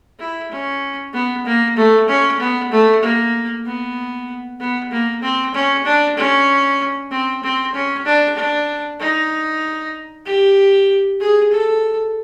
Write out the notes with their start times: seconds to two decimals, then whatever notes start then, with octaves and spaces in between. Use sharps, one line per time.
0.19 E4
0.51 C#4
1.14 B3
1.45 A#3
1.77 A3
2.08 C#4
2.40 B3
2.71 A3
3.02 A#3
3.65 B3
4.60 B3
4.91 A#3
5.22 C4
5.54 C#4
5.85 D4
6.17 C#4
7.11 C4
7.43 C4
7.74 C#4
8.05 D4
8.37 D4
9.00 D#4
10.26 G4
11.20 G#4
11.51 A4